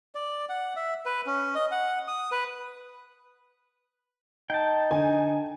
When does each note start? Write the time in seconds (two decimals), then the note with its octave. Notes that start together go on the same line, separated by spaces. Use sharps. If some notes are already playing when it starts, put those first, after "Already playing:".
0.15 D5
0.49 F#5
0.76 E5
1.06 B4
1.26 C#4
1.55 D#5
1.71 F#5
2.08 D#6
2.32 B4
4.50 D#4 G5 A5
4.91 D3 G#5